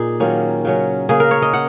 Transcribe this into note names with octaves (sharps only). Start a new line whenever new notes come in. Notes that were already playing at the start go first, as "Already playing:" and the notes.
Already playing: A#2 D#4 G#4
D#3 F#3 A#3 C#4
C#3 F#3 C#4
C#3 A#3 C#4 G#4
A#4
C#5
D#5
F#5